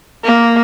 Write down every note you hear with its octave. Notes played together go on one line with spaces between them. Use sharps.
A#3